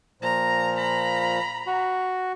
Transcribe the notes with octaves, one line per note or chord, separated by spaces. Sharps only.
A#2 F3 A#5
A#5 B5
F#4